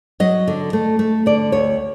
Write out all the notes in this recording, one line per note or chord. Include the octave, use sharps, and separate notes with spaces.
F#3 D#5
D3
A3
A3
D3 D5
D2 C#5